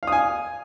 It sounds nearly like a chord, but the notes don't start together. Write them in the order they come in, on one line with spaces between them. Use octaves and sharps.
F5 D#6 G#5